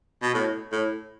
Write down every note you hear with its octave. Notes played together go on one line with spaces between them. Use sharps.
B2
A2
A2